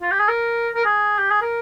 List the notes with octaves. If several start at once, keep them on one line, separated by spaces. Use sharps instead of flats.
F4
G4
G#4
A#4
A#4
G#4
G4
G#4
A#4